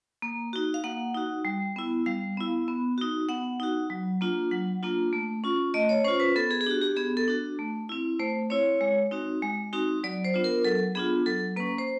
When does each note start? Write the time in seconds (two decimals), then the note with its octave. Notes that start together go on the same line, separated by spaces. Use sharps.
0.22 A#3
0.53 D#4 F#4
0.74 F5
0.84 A#3 F#5
1.14 D#4 F#4
1.45 G3
1.76 B3 E4
2.06 G3 F5
2.37 B3 E4
2.68 B3
2.98 D#4 F#4
3.29 B3 F#5
3.60 D#4 F#4
3.90 F#3
4.21 A#3 D4 F4
4.51 F#3 F#5
4.83 A#3 D4 F4
5.13 A3
5.44 C#4 F4
5.74 A3 D#5
5.89 C#5
6.05 C#4 F4 C5
6.20 B4
6.36 B3 A4
6.51 G#4
6.61 G#4
6.66 D4 G4
6.71 F#4
6.82 G4
6.96 B3 G#4
7.17 A4
7.28 D4 F#4
7.59 A3
7.89 C4 E4
8.19 A3 C5
8.50 C4 E4 C#5
8.81 G#3
9.11 C4 D#4 F#4
9.42 G#3
9.73 C4 D#4 F#4
10.04 F#3 D5
10.24 C5
10.34 B3 D4 F4
10.44 A#4
10.64 F#3 A4
10.95 B3 D4 F4 G#4
11.26 F#3 A4
11.56 A#3 C#4 B4
11.78 C5